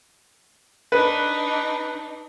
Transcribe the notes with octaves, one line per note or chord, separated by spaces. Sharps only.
D4 D#4 B4